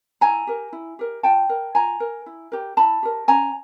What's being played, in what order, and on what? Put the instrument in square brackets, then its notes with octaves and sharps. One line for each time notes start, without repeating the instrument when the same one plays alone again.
[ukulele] E4 G#5 A#5
G4 A#4
E4
G4 A#4
F4 G5 A5
A#4
F4 G#5 A#5
A#4
E4
G4 A#4
E4 A5 B5
G4 A#4
C#4 G#5 A#5